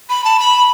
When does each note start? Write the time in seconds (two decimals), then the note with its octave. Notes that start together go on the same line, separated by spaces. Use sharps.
0.09 B5
0.24 A5
0.40 B5